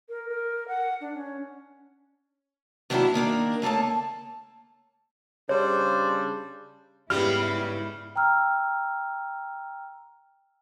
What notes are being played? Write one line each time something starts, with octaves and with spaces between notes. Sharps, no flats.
A#4
A#4
F#5
D4
C#4
D#3 F#3 A#3 B3 D4 E4
D#3 A#3 D4 A#4
C#3 A3 A#3 A4 A5
C#3 G3 D4 C5 C#5
G#2 C#3 G3 B3 E4 G4 F6
G5 A#5 E6 F6